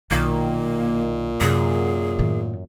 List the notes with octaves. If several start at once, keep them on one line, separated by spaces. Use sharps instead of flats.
B1 A#2 D#3 A#3
F#2 C3 G#4
A2 D#3